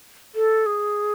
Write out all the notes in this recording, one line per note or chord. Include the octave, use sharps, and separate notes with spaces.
A4
G#4